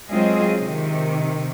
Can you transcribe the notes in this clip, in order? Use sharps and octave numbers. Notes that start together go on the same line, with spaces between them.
F#3 G#3 C4 F4 G#4 D#5
C3 D#3